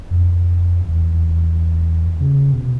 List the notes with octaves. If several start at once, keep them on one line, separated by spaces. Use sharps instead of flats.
F2
E2
C#3
B2